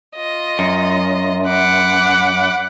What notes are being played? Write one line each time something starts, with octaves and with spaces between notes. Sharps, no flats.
F4 D#5
F#2
F#5 B5 D6